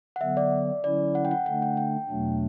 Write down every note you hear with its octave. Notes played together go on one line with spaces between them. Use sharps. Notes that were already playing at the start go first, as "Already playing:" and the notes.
F#5
D3 F#3 B3 E5
D5
D3 F#3 C#4 E4 D5
F#5
G5
F#5
D3 A3 D4 F#5
G5
G5
E2 B2 F#3 A3 D4